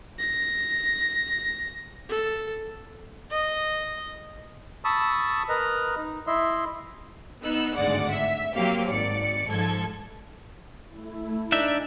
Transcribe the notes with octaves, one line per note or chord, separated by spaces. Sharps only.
A#6
A4
D#5
A5 B5 C#6 D#6 E6
A#4 B4 D#5 A#5
D#4
E4 D#5 E5 C6
B3 D#4 E6 F#6
G#1 D2 G2 G#3 D5 F#5
E5
F#3 A#3 C4 G4 F5
G#1 D5 C#7
G#2 F3 A4 G#6
A3 E4
D4 D#4 E5 G#5